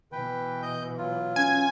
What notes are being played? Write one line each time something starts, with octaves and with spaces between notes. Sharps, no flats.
B2 E3 B4 G5
D#5 G6
F#3 F4
C#4 G#5